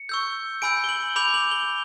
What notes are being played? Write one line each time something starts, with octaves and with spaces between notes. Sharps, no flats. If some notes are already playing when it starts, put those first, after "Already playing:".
Already playing: C#7
C#6 E6 G6
G#5 B5 E6 G6 D7
G7
F#7
B5 D6 G6 F7
F#7
G7